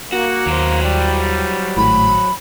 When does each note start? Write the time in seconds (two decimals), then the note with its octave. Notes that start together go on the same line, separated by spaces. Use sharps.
0.12 A#3 F#4
0.46 D#2 F#3 C5
0.82 G3
1.77 G#1 A2 B5